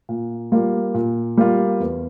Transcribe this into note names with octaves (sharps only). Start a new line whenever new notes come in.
A#2
G3 A#3 F4
A#2
G3 A#3 F4
E2